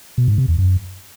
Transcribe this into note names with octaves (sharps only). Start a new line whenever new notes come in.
B2
G#2
C3
E2
F#2